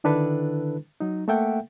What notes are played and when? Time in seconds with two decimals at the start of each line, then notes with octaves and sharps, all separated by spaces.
0.04 D3 D#3 D4 E4 A4 B4
1.00 F#3 D#4
1.28 A3 A#3 A4 E5 F#5 G5